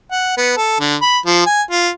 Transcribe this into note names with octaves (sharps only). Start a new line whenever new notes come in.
F#5
B3
A4
D3
B5
F3
G#5
F4